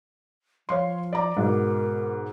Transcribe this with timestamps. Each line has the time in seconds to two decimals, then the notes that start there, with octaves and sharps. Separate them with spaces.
0.69 F3 C#5 F5 C6
1.13 D5 A#5 D6
1.37 G#2 B2 A#4